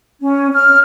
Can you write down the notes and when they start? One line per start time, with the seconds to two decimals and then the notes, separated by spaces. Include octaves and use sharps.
0.22 C#4
0.53 F6